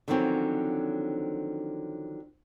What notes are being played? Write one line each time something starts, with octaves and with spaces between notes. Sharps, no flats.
D3 D#3 F3 F#3 C4 C#4